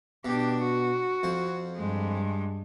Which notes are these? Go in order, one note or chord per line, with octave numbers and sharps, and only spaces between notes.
B2 D4 G4
F#4
F2 C5
G2 G#3